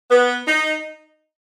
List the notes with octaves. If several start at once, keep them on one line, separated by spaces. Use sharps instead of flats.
B3
D#4